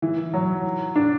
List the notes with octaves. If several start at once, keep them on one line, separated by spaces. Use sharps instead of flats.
E3
F#3
D4